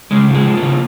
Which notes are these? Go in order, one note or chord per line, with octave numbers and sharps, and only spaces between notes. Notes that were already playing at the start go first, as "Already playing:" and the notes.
C#3 G#3
F3
G#3
F3
C#3 A#3